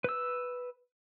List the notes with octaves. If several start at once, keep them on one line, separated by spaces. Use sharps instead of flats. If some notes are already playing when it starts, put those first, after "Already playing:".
B4 E6